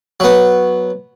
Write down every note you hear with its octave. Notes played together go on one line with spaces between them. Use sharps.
F#3 B3